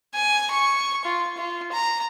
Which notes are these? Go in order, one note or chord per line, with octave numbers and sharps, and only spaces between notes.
G#5
C#6
F4
F4
A#5